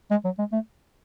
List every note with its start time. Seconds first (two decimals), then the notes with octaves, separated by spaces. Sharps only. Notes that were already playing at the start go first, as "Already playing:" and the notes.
0.10 G#3
0.25 F#3
0.39 G#3
0.52 A3